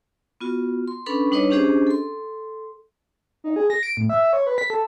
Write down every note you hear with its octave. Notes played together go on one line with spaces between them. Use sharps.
B3 F4 F#4
C6
C#4 D4 A4 B4 B5 C#6
G3 D4 D#4 B4 C#5 D#5
C#4 D4 G4 G#4 C5 D#5
A4 C6
D#4
G#4
A#6
D7
A2
E5
C#5
B4
B6
A4